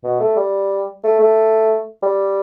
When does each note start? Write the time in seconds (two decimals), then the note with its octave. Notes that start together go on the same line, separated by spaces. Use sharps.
0.04 B2
0.20 A3
0.36 G3
1.04 A3
1.20 A3
2.03 G3